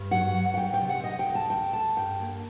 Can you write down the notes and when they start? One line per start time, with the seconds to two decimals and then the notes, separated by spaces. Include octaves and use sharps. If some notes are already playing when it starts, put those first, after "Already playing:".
Already playing: G2
0.11 F#3 F#5
0.34 F#3
0.54 F#5
0.58 F#3 G5
0.74 G5
0.81 C3
0.89 F#5
1.04 C3 D#5
1.19 G5
1.27 D2
1.35 A5
1.50 D2 G5
1.73 D2 A5
1.96 G2 G5
2.20 A#3